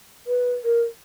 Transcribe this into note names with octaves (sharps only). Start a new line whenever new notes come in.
B4
A#4